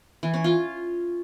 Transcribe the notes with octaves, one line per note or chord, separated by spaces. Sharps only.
E3
C#4
F4